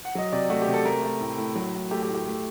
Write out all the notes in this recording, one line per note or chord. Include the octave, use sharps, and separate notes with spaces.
F#5
F#3 D#5
C3 D5
A3 F#4
G4
C3
A4
A3 A#4
A3
A2
A2
F#3
A2
A3 G4
G4
A2
G4
A3